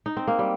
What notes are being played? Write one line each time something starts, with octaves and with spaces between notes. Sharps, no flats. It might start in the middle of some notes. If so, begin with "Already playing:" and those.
D#4
C4
A#3
G3